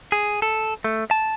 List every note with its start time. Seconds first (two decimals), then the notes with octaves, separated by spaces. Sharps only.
0.12 G#4
0.42 A4
0.84 A3
1.11 A5